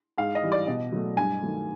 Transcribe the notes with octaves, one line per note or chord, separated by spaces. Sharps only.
G#2 F5
D#5
E3 G3
D5
B2 D#5
F#3 A3
G2 G#5
D#3 F#3 A3